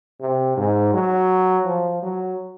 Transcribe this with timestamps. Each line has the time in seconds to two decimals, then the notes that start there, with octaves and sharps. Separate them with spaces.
0.21 C3
0.57 G#2
0.93 F#3
1.65 F3
2.03 F#3